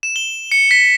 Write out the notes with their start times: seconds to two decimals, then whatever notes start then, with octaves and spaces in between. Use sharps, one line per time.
0.03 E7
0.16 G7
0.52 C#7
0.71 B6